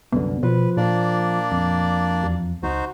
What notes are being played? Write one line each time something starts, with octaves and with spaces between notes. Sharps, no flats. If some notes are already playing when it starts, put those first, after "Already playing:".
C2 F#2 D3 B3
B2 F3 B4
A#2 A#3 D4 D5
F2
E2
C#2 D#4 F#4 C5